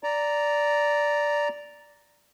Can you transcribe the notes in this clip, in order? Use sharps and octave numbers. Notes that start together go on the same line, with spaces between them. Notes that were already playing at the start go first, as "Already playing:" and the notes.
D5 A#5